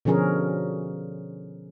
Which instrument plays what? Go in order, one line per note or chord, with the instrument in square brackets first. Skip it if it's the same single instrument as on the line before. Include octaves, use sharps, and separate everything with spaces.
[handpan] B2 D3 F3 C#4 G#4 A#4